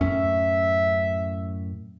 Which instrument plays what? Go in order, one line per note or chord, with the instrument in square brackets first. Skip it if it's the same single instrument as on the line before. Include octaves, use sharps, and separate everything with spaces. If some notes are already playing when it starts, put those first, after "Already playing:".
[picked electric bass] F#2 A2 C#4 [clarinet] E5